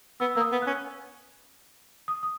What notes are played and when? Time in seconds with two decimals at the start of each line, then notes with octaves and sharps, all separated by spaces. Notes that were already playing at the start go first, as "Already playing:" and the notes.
0.20 B3 E6
0.35 A#3 E6
0.41 D#6
0.52 B3
0.62 C#4 F#6
2.08 D#6
2.23 D#6